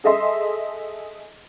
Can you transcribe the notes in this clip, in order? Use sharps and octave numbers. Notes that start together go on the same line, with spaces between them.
G#4 A4 D#5 E5 C6